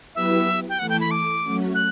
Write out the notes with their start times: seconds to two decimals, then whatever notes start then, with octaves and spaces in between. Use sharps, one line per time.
0.14 F#3 B3 E4 G4 B4 E5
0.69 G5
0.79 E3 A3 E4 A4 F#5
0.89 G5
1.00 B5
1.11 D6
1.43 F#3 A3 C#4 F#4
1.75 F#6